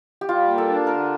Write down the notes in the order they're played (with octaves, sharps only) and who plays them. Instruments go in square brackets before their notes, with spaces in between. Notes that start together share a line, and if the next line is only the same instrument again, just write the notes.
[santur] G4
[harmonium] G3 [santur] F4
[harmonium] A#3
[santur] A4
[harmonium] D4
[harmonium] D3 [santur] A#4